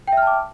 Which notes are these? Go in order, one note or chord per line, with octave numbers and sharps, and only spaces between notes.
E5 G5 A5 D6 F6